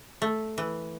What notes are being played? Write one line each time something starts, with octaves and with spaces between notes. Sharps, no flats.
A3
E3